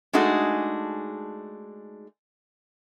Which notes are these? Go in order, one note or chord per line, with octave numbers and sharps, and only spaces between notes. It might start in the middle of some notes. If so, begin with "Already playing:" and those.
G#3 A3 D4 D#4 F#4 G#4